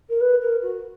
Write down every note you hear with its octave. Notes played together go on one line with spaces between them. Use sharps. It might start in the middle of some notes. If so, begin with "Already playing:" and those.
A#4
B4
A#4
F#4